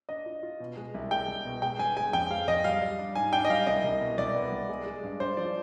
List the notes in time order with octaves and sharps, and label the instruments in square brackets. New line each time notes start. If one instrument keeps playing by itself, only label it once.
[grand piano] D4 [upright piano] D#5
[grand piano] F4
F4
B2
G#3
C2
[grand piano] G#3 [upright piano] G5
[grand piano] C2
B2
[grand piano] G#3 [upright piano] G5
[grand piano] G1 [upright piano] G#5
[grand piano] G#3 [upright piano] G#5
[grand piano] F2 [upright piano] G5
[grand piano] G#3 [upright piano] F5
[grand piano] F2 [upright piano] D#5
[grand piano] G3 [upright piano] F5
[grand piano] G3
D4
[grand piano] G#2 [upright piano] G#5
[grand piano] D4 [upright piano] G5
[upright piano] D#5
[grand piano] G3 [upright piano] F5
[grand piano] C2 [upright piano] D#5
[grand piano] C2
B2
[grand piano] C2 [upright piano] D5
[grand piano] B3
C2
G#3
G#3
G2
[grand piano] G2 [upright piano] C5
[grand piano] F3 [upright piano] D5